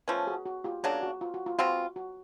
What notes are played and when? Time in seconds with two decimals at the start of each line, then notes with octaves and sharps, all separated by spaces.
0.08 F3 A3 C#4 B4 C#5
0.27 F#4 G#4
0.46 F#4
0.64 F4 G4
0.83 C#3 F#3 A#3 D4 F#4 G#4
1.03 F#4
1.21 F4
1.34 F#4
1.46 F4
1.59 B2 G#3 C4 F4 F#4
1.96 F#4